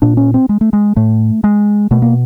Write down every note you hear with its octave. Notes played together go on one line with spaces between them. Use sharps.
A#2 D4
C#4
C4
G#3
A3
G#3
A2 A3
G#3
B2 A3
A#3